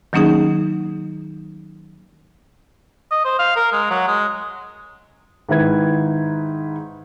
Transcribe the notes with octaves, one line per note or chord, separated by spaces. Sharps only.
D#3 F#3 A#3 C#4 D#4 G#4
D#5
C5
F5
A#4
G#3
F#3
G#3
G#2 D#3 E4 B4 G#6